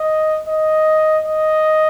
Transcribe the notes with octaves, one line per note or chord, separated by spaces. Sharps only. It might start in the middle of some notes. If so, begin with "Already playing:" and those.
Already playing: D#5
D#5
D#5